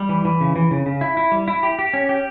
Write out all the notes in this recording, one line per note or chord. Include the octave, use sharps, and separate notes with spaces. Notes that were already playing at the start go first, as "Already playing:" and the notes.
Already playing: G3
E3
E3
C#3
E3
C#3
C#3
E4
E4
G3
E4
G4
G4
C#4
G4